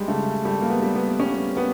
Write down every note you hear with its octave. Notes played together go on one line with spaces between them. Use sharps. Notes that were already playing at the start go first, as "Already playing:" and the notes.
Already playing: G3 G#3
C#3 A3
G3 A3
A#3
B3
G3
B3
G3 C#4
G3 B3